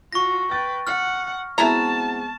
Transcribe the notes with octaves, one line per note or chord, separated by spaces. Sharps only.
F4 F#4 C#6 A#6
B4 G5 A6
F#5 F6
G#3 B3 C4 E4 F#4 A5 A#5